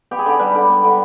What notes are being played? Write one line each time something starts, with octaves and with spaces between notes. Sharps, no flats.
B3 G4
G#4
D3 G4
G3 B4
D3
B3
D3